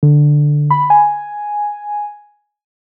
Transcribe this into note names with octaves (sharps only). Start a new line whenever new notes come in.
D3
B5
G#5